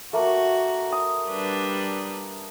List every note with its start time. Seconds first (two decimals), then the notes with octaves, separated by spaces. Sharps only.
0.13 A3 A#3 F#4
0.92 D#6
1.29 G3 D4 B4